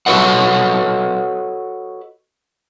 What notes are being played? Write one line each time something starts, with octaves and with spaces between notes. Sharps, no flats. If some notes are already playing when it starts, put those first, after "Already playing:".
F#4 A4 B4 C#5 D#5 F#5